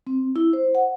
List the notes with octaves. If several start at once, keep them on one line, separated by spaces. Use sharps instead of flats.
C4
E4
C5
F#5